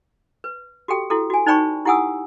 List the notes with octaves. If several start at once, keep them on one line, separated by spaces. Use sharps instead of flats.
B4
F#4 G4 A4 G5
E4 F#4 A4
F#4 G#5
D#4 C5 D5 G5 B5 C#6
E4 G4 F#5 G#5 D#6 E6